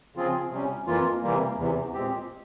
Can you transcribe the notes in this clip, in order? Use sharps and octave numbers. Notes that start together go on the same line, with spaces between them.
C#3 F3 C4 F4 G#4
C3 G3 C#4
F2 E3 A#3 F4
C3 E3 G3 A#3
E2 C3 E3
A#2 G#3 C4 G4